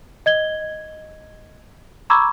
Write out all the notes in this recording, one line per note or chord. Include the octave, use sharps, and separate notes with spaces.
D#5 G#6 G7
A#5 B5 C#6 D6 E6 G#6